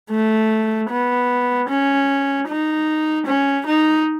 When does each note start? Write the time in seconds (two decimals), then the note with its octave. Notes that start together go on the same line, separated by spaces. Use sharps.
0.10 A3
0.90 B3
1.69 C#4
2.48 D#4
3.26 C#4
3.66 D#4